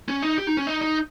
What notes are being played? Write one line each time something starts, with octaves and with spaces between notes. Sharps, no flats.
C#4
D#4
G4
D#4
C#4
D#4
D#4